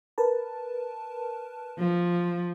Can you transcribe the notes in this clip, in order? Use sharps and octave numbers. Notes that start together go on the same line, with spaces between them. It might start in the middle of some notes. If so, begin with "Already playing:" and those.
A#4 B4 A5
F3